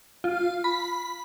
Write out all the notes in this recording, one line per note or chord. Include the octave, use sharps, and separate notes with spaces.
F4
B5